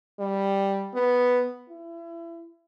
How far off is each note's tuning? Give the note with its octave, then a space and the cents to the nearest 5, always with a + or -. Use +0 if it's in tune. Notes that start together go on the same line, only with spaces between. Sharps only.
G3 +0
B3 +0
E4 +30